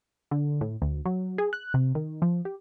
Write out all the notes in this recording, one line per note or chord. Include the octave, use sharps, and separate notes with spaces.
D3
A2
D2
F#3
G#4
F#6
C3
D#3
F3
G4